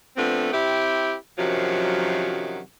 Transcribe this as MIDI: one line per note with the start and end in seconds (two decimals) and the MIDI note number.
0.17 0.50 53
0.17 0.50 57
0.17 0.50 59
0.17 0.50 60
0.17 0.50 62
0.52 1.13 60
0.52 1.13 64
0.52 1.13 67
1.38 2.59 42
1.38 2.59 48
1.38 2.59 51
1.38 2.59 53
1.38 2.59 54